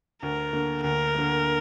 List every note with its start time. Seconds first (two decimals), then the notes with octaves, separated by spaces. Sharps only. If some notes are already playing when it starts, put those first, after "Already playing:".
0.23 D2 A#4
0.53 D3 A#3
0.83 D2 A#4
1.15 D3 A#3